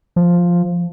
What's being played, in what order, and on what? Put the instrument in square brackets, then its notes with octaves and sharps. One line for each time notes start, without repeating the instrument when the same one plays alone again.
[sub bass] F3